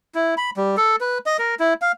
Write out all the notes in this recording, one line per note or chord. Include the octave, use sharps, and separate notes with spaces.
E4
B5
G3
A4
B4
D#5
A#4
E4
F5